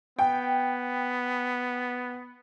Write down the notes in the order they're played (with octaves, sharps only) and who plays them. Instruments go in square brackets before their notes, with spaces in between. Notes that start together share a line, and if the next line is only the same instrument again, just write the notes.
[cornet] B3 [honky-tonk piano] G5